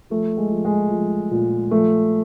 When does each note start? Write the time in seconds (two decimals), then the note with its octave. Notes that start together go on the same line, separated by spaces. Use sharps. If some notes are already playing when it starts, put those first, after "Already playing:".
0.10 F3 A3
0.37 G#3
0.51 F3
0.65 G#3
0.91 F3
1.31 A#2
1.71 F3 A3